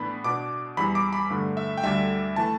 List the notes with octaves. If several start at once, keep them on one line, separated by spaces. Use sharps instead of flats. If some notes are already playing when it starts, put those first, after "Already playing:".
Already playing: A2 E3 B3 D4 B5
B2 B3 D4 D6
E2 E3 G3 B5
D6
B5
G2 D3 A3
E5
G5
D2 D3 G3 D4 E5
E3 A3 A5